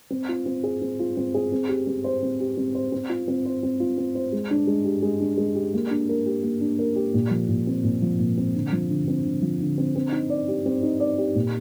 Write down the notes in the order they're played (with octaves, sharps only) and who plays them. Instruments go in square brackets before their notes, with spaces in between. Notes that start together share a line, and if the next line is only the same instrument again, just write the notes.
[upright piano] C4
F4
C4
G#4
C4
F4
C4
G#4
C4
G4
C4
C5
C4
G4
C4
C5
C4
F4
C4
C5
C4
F4
C4
C5
G#3
D4
G#3
G4
G#3
D4
G#3
G4
A#3
D4
A#4
G4
A#3
D4
A#4
G4
A#2
F3
A#2
C4
A#2
F3
A#2
C4
D3
F3
D3
C4
D3
F3
D3
C4
C4
D#4
D5
G4
C4
D#4
D5
G4
A#2